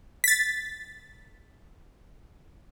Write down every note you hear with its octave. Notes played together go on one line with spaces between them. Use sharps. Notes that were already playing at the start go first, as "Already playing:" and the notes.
A6 B6